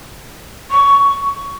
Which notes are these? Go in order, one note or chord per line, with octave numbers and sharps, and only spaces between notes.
C#6